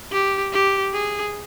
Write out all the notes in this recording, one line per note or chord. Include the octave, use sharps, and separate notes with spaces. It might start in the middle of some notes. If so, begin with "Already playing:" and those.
G4
G4
G#4